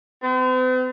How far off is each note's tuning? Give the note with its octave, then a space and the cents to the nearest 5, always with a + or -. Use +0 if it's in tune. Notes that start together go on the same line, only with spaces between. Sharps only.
C4 -45